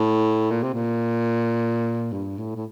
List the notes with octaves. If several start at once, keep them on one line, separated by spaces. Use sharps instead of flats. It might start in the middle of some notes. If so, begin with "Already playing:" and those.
Already playing: A2
A#2
C3
A#2
G2
A2
A2